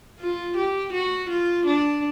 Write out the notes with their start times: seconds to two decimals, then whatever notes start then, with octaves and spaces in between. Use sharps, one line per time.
0.20 F4
0.57 G4
0.93 F#4
1.29 F4
1.66 D4